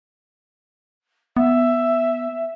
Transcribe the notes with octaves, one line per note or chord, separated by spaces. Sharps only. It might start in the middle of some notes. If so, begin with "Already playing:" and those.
B3 E5